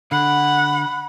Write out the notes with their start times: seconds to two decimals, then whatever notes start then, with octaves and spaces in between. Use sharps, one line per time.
0.12 D3 F#5 B5